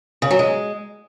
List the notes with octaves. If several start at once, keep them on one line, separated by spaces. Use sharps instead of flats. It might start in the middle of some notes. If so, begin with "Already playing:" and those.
C#3
F#3
G#3